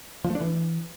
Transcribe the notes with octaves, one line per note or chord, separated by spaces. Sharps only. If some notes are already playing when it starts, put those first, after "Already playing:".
F3
A3
D4
E3